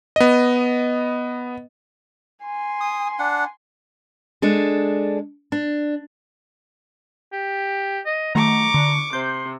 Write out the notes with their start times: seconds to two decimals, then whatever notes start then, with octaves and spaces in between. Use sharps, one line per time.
0.16 B3 D#5
2.44 G#5 C6
2.81 D#6
3.19 D4 F#5
4.42 G#3 D4 A4
5.52 D4
7.33 G4
8.06 D#5
8.35 D#3 F#3 A3 A#5 C#6 D6
8.74 D3
9.13 C3 C5 C6 G6